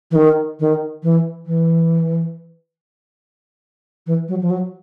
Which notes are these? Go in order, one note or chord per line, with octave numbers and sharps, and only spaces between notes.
E3
D#3
D#3
E3
E3
E3
F#3
F3
F#3